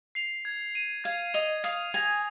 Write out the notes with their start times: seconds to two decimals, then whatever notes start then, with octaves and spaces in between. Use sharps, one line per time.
0.15 C7 F7
0.45 G#6
0.75 D#7
1.04 F5 G#6
1.34 D#5 F7
1.64 F5 D#6
1.94 G#5 A#6 F7